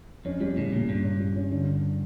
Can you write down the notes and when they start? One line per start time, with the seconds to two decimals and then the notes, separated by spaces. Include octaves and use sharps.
0.25 F2 C#4
0.40 F2 G3
0.56 A2 C#3
0.72 A#2 C#3
0.88 G2 C#4
1.04 C#4
1.20 G3
1.36 C#4
1.52 D3
1.67 D4